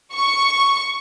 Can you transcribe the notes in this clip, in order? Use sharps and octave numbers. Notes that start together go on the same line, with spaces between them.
C#6